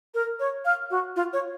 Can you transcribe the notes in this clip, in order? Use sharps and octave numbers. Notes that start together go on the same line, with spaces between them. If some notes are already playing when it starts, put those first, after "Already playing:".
A#4
C#5
F5
F#4
F4
C#5